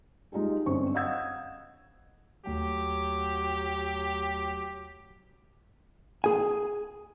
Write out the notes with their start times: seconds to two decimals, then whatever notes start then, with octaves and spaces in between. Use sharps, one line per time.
0.32 G#3 D#4 F4 G4 G#4
0.66 G1 F#2 C4 D4 C5 C#6
0.94 D#5 F5 F#5 D#6 E6 G#6
2.46 D#2 F#3 A3 G4 G5
6.24 G#4 G#5